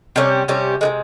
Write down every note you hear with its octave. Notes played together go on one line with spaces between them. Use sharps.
C3 G3 C#4 G4
C3 G3 C#4 G4
C3 E3 G#3